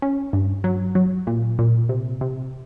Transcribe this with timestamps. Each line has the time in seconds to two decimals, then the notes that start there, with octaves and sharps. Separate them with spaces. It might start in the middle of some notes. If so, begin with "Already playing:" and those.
0.02 C#4
0.33 G2
0.64 F#3
0.95 F#3
1.27 A#2
1.59 A#2
1.89 C3
2.21 C3